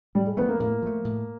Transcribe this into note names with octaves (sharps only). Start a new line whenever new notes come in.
A2 G3
G#3
F3 A3 B3
A#3
A2 A#3
F3 A3
A2